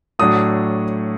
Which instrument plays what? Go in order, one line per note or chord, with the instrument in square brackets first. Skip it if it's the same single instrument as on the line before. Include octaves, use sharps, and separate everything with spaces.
[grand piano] A2 F#3 A3 D4 D#6